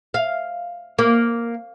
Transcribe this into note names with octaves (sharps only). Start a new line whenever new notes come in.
F5
A#3